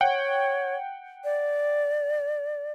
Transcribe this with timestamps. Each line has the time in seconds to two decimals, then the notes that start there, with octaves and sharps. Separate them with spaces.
0.01 C#5 F#5 G5
1.24 D5